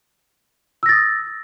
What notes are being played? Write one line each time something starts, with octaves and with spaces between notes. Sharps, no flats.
D#6 E6 A6 A#6